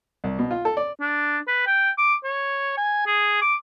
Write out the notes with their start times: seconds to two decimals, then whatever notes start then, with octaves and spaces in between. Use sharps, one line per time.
0.24 C2
0.39 B2
0.51 F4
0.65 A4
0.77 D5
1.01 D4
1.48 B4
1.66 G5
1.98 D6
2.24 C#5
2.78 G#5
3.07 G#4
3.42 D6